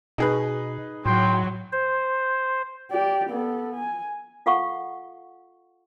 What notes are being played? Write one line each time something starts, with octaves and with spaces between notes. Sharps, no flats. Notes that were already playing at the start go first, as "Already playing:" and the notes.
B2 D#4 G#4 B4
A2 F#3 G5 C6
C5
G4 D5
B3 A4
G#5
F4 A4 F5 F#5 C#6